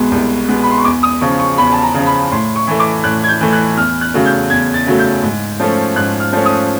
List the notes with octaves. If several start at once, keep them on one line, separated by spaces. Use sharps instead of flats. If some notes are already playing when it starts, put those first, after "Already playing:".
Already playing: C2 B2 G#3 B3
C2
B2 G#3 B3
B5
C6
C#6
E2 D6
D#6
C#3 F3 C#6
C#6
E2 B5
A5
A#5
C#3 F3
B5
A2 C6
C#6
E3 A3
D6
A2 F#6
G#6
G6
E3 A3
F#6
E2 F6
F#6
C#3 F#3 A3
G6
E2 G#6
A6
C#3 F#3 A3
G6
G#2
F3 A3 C#4
G#2 F#6
F6
F3 A3 C#4
D#6